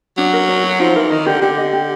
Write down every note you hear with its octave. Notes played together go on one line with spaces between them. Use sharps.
F#3 D4
A#4
C#5
F#4
F3 D#4
E3 A#4
D#3 D#5
D3 G4
D3 G4
D#5
G4